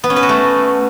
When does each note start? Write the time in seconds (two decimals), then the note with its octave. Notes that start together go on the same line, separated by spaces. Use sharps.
0.04 B3
0.10 C#4
0.16 B4
0.23 F#4
0.29 A3